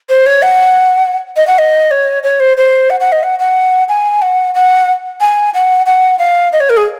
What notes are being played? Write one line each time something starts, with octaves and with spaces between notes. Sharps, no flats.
C5
C#5
F#5
D#5
F#5
D#5
C#5
C#5
C5
C5
F#5
F#5
D#5
F#5
F#5
G#5
F#5
F#5
G#5
F#5
F#5
F5
D#5
C#5
A#4
G#4